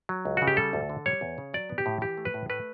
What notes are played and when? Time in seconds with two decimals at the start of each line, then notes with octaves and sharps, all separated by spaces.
0.09 F#3
0.25 C#2
0.37 C#3 F#4
0.48 G4
0.57 G3 A4
0.73 D2
0.89 D3
1.06 G3 C#5
1.21 E2
1.38 C#3
1.54 F#3 D5
1.69 B3
1.78 G4
1.86 A2
2.01 E3 G4
2.17 A3
2.25 B4
2.34 A2
2.50 A3 B4